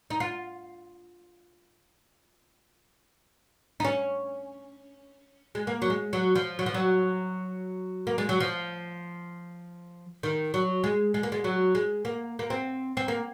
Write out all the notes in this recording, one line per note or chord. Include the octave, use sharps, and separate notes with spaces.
D#4
F4
D#4
C#4
G#3
A#3
F#3
G#3
F#3
F3
F#3
F3
F#3
A#3
G#3
F#3
F3
D#3
F#3
G#3
G#3
A#3
G#3
F#3
G#3
A#3
A#3
C4
C4
A#3